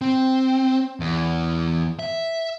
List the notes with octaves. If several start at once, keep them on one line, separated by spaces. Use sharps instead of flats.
C4
E2
E5